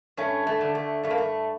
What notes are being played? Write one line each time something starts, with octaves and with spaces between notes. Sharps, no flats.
G2 A3 C#4
A3
D3
A3
G2 A3
A#3
A3